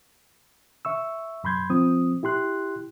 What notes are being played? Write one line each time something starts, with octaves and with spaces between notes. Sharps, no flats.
E5 C#6 E6
F#2 B5 C6 G6 G#6
F3 C4 D#6
E4 G4 C6 F#6